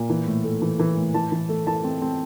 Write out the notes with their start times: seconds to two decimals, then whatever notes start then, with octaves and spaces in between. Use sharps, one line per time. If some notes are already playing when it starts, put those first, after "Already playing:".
Already playing: A#2
0.10 E3
0.27 A2
0.44 A3
0.62 E3
0.79 E3
0.97 A2
1.14 E3 A5
1.32 E3
1.49 A3
1.67 E3 A5
1.84 C4
2.02 C4